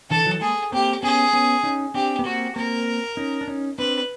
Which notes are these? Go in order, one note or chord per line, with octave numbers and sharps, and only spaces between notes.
D3 E3 A4
E3 F#3
G#3 A#3 G#4
A#3 C4 G4
B3 C#4 G#4
B3 C#4
C#4 D#4
C4 D4 G4
B3
A#3 C4 F#4
A#3 C4 A#4
C#4 D#4
D4
C#4 D#4
C4 D4 B4